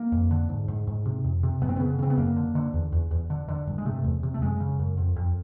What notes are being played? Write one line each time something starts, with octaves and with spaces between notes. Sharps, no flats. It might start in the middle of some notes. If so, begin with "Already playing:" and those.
Already playing: A#3
F2
D3
G#2
G#2
G#2
C3
F2
C3
F#2 B3
C4
C#3 B3
C#3 C4
B3
F#2 A#3
D3
D3
E2
E2
E2
D3
D3
G2
G#3
C3 A3
E2
C3
A3
F#2 G#3
C#3
F#2
F2
F2